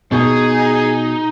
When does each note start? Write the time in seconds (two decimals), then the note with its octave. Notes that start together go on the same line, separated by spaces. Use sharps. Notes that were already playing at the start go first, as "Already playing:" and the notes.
0.12 B2 D#4 G#4